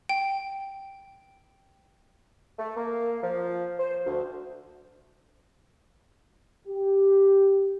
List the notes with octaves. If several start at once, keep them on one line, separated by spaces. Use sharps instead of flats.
G5
A3
A#3
F3
C5
D2
G4